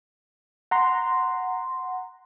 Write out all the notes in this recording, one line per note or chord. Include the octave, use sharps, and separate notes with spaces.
F#5 A#5 C6